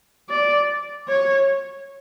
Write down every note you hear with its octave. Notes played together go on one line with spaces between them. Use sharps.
D5
C#5